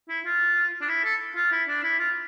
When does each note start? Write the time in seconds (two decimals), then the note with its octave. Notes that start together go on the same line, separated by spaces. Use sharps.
0.09 E4
0.25 F4
0.81 D4
0.88 E4
1.04 A4
1.36 F4
1.51 E4
1.68 D4
1.83 E4
1.99 F4